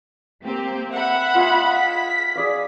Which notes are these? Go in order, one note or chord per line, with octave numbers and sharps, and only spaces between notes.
A#3 C4 G4
E5 F#5 B5
F4 D#5 G#5
B6
G#4 D5 F5